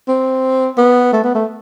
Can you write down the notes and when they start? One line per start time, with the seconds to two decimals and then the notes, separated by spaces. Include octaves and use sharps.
0.08 C4
0.78 B3
1.13 A3
1.24 B3
1.35 A3